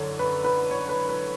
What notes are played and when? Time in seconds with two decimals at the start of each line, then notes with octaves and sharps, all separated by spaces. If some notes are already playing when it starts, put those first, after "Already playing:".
Already playing: F#2 D3 A4 C#5
0.19 B4
0.44 B4
0.71 C#5
0.89 B4
1.09 B4